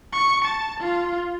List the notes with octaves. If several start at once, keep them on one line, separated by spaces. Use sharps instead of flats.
C#6
A5
F4